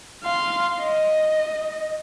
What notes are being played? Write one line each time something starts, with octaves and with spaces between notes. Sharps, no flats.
F5 C6
D#5